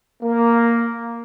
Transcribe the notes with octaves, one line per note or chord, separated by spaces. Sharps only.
A#3